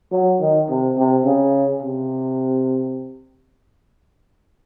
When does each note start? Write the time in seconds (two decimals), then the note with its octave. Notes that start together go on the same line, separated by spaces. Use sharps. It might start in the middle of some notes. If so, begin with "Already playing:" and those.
0.12 F#3
0.40 D#3
0.69 C3
0.98 C3
1.25 C#3
1.83 C3